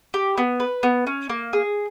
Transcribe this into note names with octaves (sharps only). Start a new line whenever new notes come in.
G4
B3
B4
B3
C#4
A#3
G#4